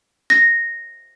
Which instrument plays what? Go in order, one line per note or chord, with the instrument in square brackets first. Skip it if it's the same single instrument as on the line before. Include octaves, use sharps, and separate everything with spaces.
[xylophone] A#6